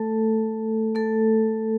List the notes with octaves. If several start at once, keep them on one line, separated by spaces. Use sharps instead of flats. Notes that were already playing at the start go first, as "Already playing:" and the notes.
Already playing: A3 A4
A3 A4